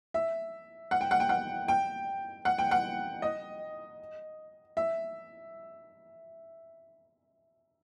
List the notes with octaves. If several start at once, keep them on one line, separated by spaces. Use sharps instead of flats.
E5
F#5
G5
F#5
G5
F#5
G5
F#5
G5
F#5
D#5
E5